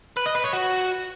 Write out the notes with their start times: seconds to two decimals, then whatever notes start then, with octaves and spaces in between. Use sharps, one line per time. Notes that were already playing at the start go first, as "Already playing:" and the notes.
0.17 B4
0.26 D#5
0.35 B4
0.44 C#5
0.53 F#4